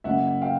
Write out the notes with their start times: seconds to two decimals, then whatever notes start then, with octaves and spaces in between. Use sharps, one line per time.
0.04 F#1 E5 F#5
0.42 F5 G5